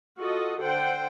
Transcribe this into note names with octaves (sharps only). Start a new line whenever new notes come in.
F4 F#4 A4 D#5
D3 A4 C5 F#5 G5